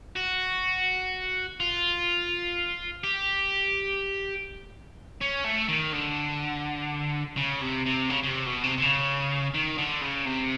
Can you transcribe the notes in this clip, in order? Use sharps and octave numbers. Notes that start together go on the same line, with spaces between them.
F#4
F4
G4
C#4
A3
D#3
D3
C#3
C3
C3
C#3
C#3
C3
B2
C3
C3
C#3
D#3
D3
C#3
C3